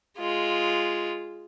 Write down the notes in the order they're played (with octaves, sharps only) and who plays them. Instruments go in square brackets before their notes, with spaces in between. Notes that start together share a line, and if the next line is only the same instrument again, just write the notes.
[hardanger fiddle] G#3 F4